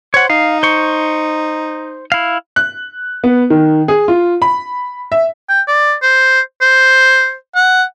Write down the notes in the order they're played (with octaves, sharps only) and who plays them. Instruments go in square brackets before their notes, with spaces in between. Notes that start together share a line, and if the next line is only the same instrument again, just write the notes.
[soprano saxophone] C5 [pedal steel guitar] C#5 F#5
[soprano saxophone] D#4 [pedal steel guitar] F5
[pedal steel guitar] C5 C#6
E4 F5
[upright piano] F#6
B3
D#3
G#4
F4
B5
E5
[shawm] G5
D5
C5
C5
F#5